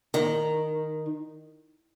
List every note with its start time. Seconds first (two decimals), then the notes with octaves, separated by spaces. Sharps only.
0.14 D#3